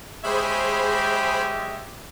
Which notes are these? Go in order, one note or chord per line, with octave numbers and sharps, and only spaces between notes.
G#3 G4 G#4 C5 C#5 D#5 E5 B5